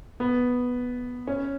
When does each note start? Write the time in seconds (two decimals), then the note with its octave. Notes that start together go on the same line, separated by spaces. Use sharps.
0.20 B3
1.27 C#4